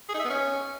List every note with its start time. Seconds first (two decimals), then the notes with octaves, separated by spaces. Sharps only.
0.09 G#4
0.14 D#4
0.19 E5
0.25 B3
0.30 C#4